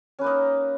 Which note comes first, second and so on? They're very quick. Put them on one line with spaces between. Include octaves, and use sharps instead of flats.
C#4 B4 A#3 D#4